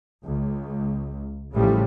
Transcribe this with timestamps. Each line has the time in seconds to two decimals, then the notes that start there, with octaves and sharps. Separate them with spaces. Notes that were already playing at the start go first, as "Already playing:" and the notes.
0.24 C#2
1.53 A1 A2 C#3 F3 G3